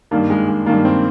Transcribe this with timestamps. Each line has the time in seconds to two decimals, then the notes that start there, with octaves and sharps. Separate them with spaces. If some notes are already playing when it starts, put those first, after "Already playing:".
0.11 G2 D#3 A#3
0.30 G#3
0.48 G#3
0.66 G2 D#3 A#3
0.85 C4